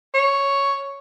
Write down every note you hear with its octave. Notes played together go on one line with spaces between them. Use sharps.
C#5